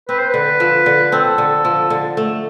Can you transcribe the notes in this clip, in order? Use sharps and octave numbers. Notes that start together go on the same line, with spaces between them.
C4 B4
C5
D3 B4
F3
D3
C4 A4
D3
F3
D3
A3